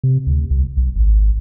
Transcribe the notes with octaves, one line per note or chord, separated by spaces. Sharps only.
C3
D2
C2
B1
G#1